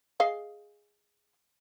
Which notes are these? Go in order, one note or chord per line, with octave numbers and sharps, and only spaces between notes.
G#4 D#5 F5